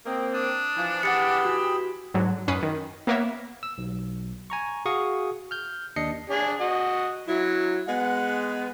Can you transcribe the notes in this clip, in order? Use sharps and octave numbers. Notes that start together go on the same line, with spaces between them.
A#3 C4 D#5
D4 D#6
E3 F3
E3 G4 G#4 F#5 B5 E6 A6 C#7
F#4
G#2 D3 F#3
F#2 C#4 B4 D#6 C7 C#7
D#3
A#3 B3 A#4 C#5 E5
E6
B1
G#5 A#5 C#6
F#4 G#4 F5 C#6 D#6
F6 G6
D#2 D4 D#5 C7 C#7
D4 G#4
F#4 D#5
F#3 E4
G#3 B3 F#5